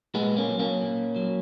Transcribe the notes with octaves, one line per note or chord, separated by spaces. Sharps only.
A#2 G#3 B3
A#3 C#4
F#3
A#3 C#4
A#2
F#3